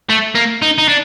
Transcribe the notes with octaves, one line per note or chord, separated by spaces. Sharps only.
A3
A#3
D#4
D#4
D4